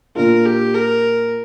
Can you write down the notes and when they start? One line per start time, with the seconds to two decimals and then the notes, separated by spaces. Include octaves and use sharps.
0.16 A#2 A#3 D4 F4 A#4
0.45 G4
0.74 A#4